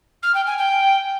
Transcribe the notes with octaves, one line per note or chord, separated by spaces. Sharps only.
F6
G5
G#5
G5